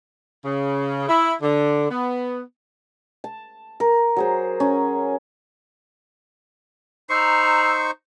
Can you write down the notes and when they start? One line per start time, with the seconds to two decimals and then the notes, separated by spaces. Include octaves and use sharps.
0.44 C#3
1.08 E4
1.42 D3
1.90 B3
3.24 A5
3.80 A#4
4.16 F#3 G#4 C5
4.60 C#4
7.10 D#4 C5 A#5 B5 C#6 E6 C7